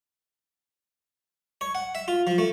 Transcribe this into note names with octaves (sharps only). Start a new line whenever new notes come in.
C#5
F#5
E5
F4
F3
A3